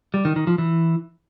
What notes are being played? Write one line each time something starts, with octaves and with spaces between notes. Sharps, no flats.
G3
D#3
D#3
F3
E3